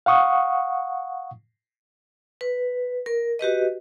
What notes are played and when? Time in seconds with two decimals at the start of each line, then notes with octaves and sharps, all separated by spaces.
0.06 F5 F#5 C#6 D#6
2.41 B4
3.06 A#4
3.39 F#4 G4 B4 D#5